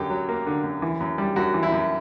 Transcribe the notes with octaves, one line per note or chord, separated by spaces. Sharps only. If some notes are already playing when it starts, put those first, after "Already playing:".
Already playing: F#2 D3 G4
F#3
A#3
D3
F#2
E3
F#2
G3
F#2 F#4
E3
E4
F#2